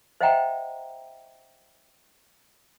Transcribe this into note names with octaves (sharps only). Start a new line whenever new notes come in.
C5 D#5 E5 F#5 G5 A#5